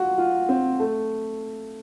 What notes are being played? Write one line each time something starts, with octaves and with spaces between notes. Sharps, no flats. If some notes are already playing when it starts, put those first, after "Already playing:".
Already playing: F4 F#4
F4
C4
A3